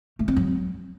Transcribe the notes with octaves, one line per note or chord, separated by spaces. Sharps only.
A3
C4
F#3